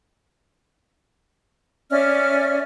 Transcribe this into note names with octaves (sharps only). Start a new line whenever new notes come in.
C#4 D5 E5 F6